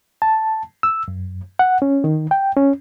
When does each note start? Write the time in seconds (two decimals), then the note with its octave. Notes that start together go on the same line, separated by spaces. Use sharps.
0.22 A5
0.83 E6
1.08 F#2
1.59 F#5
1.82 C#4
2.04 D#3
2.31 G5
2.56 C#4